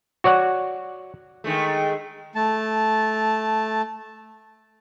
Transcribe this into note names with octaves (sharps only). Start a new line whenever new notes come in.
F#4 C#5 D5 F#5
D#3 G#3 A3
A3 A5